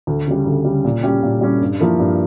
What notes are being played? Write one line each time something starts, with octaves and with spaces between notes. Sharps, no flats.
D2
C#3 G3
D2
C#3 G3
A#2
G3 C#4 G4
A#2
G3 C#4 G4
G2
F3 A#3 E4
G2